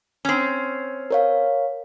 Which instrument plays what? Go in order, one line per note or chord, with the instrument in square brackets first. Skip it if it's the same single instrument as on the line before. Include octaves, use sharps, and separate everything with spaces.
[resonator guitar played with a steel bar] C4 C#4
[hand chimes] A#4 C#5 F5